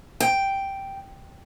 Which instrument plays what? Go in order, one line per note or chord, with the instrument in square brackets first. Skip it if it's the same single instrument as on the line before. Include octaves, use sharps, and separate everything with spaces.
[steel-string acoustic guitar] G5